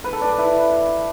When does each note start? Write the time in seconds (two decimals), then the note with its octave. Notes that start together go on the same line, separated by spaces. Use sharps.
0.04 B4
0.13 A4
0.21 D4
0.30 B4
0.38 E4